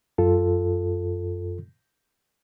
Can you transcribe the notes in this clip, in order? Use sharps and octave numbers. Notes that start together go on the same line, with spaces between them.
F#2 F4 A4